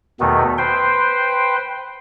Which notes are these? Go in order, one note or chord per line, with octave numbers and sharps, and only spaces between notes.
E2 B2 D#3 A3 B3
B4 C5 G5 C6